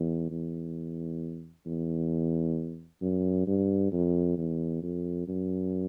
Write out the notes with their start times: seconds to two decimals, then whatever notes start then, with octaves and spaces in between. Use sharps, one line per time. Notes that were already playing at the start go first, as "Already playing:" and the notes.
Already playing: E2
0.30 E2
1.66 E2
3.02 F#2
3.47 G2
3.92 F2
4.38 E2
4.82 F2
5.27 F#2